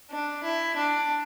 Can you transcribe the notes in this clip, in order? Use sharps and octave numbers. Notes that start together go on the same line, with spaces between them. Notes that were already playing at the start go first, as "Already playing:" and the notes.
D4
E4
D4